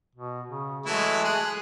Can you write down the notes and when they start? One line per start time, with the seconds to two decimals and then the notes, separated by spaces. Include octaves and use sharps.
0.15 B2
0.49 C#3
0.86 E3 F#3 G#3 A3 E4 F#4
1.24 G#4 F#6